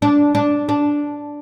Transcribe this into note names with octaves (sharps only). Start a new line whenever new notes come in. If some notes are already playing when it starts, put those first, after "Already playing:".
D4
D4
D4